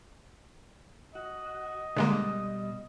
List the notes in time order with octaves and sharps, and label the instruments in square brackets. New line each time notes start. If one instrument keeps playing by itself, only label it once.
[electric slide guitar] F#4 [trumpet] D#5
[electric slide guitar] B2 G3 [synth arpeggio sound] D3 G#3 A#3